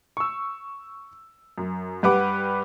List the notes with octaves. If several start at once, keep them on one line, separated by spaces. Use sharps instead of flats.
C#6 E6
F#2
G2 G4 B4 F#5 D6